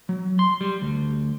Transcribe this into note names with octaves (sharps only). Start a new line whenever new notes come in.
F#3
C6
G3
D2